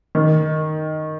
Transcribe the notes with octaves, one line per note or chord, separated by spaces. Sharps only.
D#3